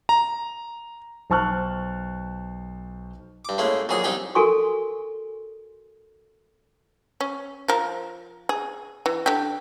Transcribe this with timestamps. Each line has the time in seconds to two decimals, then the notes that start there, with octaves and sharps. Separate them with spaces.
0.09 A#5
1.30 B1 C5 A5 C#6 F6 F#6
3.45 G2 D6
3.58 A2 G#3 A#3 C#4
3.89 A#1 F#2 D#3 G#4 G#5 D#6
4.04 C2 D#4 G4 G#5
4.35 F#4 A4 A#4 G#5 C6 C#6
7.21 C#4
7.68 F3 A#4
8.49 G#4
9.06 E3
9.26 D3 G4